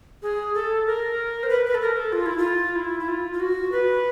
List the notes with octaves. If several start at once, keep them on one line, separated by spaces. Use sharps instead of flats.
G#4
A4
A#4
C5
B4
B4
A4
A#4
A4
F4
E4
F4
E4
E4
F4
F4
F#4
B4